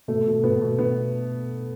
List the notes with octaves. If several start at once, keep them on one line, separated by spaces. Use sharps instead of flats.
B2 A3
B2
B2 B3
B2
B2 B3